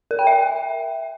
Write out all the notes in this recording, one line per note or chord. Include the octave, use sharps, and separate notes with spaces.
A#4
G5
E5